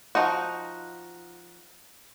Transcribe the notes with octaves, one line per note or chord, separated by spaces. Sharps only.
F3 D#4 F#4